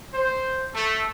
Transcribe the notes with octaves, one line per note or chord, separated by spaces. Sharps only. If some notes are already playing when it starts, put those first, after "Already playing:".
C5
A3